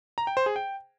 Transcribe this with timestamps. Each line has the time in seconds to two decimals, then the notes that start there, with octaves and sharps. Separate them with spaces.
0.18 A#5
0.27 G5
0.37 C5
0.46 G#4
0.56 G5